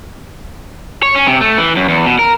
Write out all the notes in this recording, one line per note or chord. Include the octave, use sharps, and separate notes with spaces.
C#5
C#4
C3
A3
E3
F#2
E2
B2
A#4